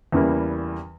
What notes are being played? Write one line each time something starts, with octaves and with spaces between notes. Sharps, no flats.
E2 C#3 E3 G3 A#3